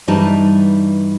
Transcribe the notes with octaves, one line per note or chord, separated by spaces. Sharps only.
G2 E3 G3 D#4 B4 A5